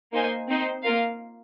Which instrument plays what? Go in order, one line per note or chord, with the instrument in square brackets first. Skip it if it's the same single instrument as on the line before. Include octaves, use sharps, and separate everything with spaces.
[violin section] A#3 D#4 C5 G#5
C4 D#4 C5
A#3 F4 A#4 F5